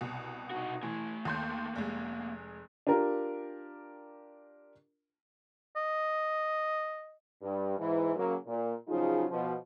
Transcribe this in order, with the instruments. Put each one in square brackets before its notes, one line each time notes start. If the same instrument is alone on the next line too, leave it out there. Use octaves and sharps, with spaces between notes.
[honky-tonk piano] C2 B2
[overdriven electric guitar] D#4 F#4
[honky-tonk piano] E3 [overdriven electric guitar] A3 G#5
[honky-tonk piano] D#2 C6 G6 [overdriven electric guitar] A3 A#3
[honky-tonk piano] F1 G#3
[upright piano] D4 F4 G4 A#4
[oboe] D#5
[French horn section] G2
G#2 E3
C#3 F#3 A#3
A#2
C#3 F3 F#3 D#4 F4 G#4
B2 F3